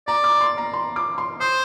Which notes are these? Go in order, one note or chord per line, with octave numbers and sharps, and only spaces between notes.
D5 A#5
D6
C6
A#5
C6
D6
C6
C5 D#6